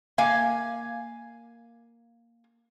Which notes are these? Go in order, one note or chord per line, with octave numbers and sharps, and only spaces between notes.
A#3 F5 G#5